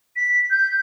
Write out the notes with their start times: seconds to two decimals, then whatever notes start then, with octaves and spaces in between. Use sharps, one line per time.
0.16 B6
0.50 G6